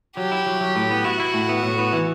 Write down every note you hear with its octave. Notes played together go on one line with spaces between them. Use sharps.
F#3 G4
E4
F#3
F#3
A2
B3
E4 F#4
E4
A2
B3
A2
B3
E3